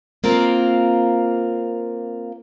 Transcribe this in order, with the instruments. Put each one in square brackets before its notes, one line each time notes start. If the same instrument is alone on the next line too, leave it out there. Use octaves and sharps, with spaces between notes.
[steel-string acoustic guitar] A#3 C4 F4 A#4